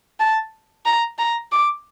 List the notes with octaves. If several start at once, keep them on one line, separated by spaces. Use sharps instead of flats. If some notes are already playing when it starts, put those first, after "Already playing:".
A5
A#5
A#5
D6